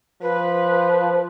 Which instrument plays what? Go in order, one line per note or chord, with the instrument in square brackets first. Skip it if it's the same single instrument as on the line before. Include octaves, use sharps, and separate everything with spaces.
[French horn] F3 [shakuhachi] B4